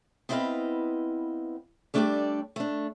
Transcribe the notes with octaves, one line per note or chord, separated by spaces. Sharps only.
B3 C4 E4 B4 D#5 F5
G3 A3 D4 G4 A4 D5
A3 D4